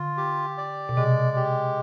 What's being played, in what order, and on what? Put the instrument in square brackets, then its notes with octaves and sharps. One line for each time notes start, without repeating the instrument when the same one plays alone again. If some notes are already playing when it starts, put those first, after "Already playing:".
Already playing: [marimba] D3 [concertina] F4
[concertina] G4
D5
[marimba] B2
[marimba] C3 [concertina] G#3
[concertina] G4